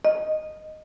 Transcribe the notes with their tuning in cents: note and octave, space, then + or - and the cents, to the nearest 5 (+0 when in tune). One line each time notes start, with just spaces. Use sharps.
D#5 -5